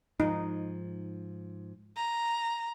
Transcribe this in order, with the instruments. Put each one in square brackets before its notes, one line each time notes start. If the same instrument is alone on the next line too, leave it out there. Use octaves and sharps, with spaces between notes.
[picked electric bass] G#2 F3 [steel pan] D#4
[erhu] A#5